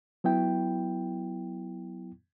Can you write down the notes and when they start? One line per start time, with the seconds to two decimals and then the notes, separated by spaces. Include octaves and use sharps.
0.24 F#3 B3 E4 G5